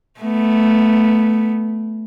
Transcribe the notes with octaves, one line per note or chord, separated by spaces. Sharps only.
A3 B3